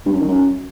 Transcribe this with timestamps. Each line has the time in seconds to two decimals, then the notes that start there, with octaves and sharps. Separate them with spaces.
0.06 G2
0.13 F#2
0.21 D#3
0.28 F#2